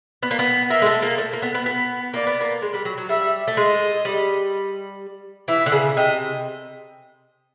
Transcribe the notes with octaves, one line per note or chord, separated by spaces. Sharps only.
B3
A#3
B3
A#3 E5
G#3
A3
A#3
A3
A#3
B3
B3
B3
A#3 D5
B3
A#3
G#3
G3
F#3
F#3
G3 E5
A3
G#3 D#5
G3
E3 E5
D3
C#3
C3 D#5